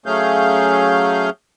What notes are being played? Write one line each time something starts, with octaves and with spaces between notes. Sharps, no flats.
F#3 A3 C#4 G#4 F5 G6